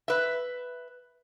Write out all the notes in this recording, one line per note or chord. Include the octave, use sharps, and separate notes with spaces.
B4 E5